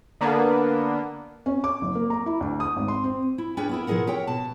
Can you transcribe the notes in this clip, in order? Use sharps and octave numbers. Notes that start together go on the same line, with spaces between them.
D3 A#3 B3 D4
C#4
D6
F#1
A#3
A#5
E4
D2
D#6
G#1
C6
C4
E4
C#4 D4 G#4 B4 G5
B3 E4 A#4
B2 F3 E4 G#4 A#4 F#5
G4 A#4 C#5 F#5 G5
B2 A5